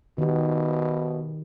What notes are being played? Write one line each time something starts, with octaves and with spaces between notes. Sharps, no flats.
B2 D#3 G4